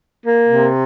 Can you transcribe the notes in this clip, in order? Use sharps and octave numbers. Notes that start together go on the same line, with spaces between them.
A#3
C3